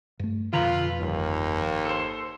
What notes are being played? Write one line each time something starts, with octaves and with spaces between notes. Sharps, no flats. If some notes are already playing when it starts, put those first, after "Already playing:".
G2 A3
F2 B2 D3 F4 B4 A#5
G1 D#2
A4 C5